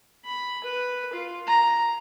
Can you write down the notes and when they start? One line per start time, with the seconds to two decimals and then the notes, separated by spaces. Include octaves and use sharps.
0.25 B5
0.64 B4
1.13 F4
1.47 A#5